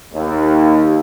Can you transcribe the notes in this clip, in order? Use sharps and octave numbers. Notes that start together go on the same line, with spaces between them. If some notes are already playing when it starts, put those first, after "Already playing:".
D#2